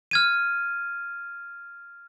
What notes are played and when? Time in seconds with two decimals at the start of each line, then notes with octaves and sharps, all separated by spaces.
0.11 F6 G#6 D#7